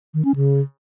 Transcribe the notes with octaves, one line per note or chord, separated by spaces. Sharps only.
D#3
C#4
C#3